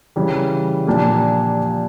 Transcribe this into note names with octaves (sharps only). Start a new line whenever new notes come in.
C#3 E3 G3
A#2 F3 A#3 D4 G4